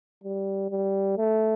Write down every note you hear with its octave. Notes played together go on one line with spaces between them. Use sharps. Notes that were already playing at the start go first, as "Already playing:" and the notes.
G3
G3
A3